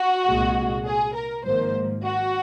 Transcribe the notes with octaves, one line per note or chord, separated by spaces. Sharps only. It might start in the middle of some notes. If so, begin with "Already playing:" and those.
Already playing: F#4
C2 A#2 G#3
G#4
A#4
G#1 G#2 F3 A#3 C5
F#4